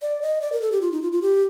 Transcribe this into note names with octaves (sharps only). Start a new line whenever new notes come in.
D5
D#5
D5
A#4
A4
G4
F4
D#4
F4
F4
G4